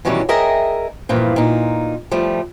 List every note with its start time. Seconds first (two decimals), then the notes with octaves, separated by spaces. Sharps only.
0.05 B2 D#3 E3 F#3 G3 C#4
0.28 G#4 A#4 D#5 E5 G5
1.09 G2 A#2 E3 F3
1.36 A#2 D#4
2.11 F3 G3 A3